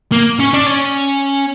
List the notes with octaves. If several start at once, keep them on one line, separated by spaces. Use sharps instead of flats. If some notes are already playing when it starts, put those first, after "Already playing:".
A#3
C#4
D4
C#4